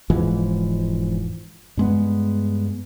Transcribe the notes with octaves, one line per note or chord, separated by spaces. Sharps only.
E1 G#2 E3 F3
G2 G#3 B3